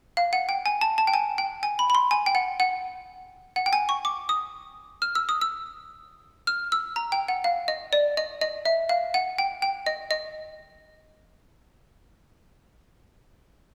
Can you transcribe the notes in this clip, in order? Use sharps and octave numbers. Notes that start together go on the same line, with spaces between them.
F5
F#5
G5
G#5
A5
A5
G5
G#5
G5
G#5
B5
B5
C6
G#5
G5
F#5
F#5
F#5
G5
G#5
C#6
D6
D#6
F6
E6
D#6
E6
F6
E6
A#5
G5
F#5
F5
D#5
D5
D#5
D#5
E5
F5
F#5
G5
G5
D#5
D#5